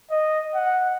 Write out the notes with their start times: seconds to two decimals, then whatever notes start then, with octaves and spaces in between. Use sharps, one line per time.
0.11 D#5
0.55 F#5